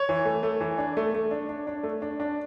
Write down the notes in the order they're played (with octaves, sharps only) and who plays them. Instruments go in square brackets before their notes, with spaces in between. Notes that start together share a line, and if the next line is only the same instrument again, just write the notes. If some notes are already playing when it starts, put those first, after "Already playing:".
Already playing: [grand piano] C#5
E3
A3
A3
E3
D4
A3
A3
D4
D4
D4
A3
D4
D4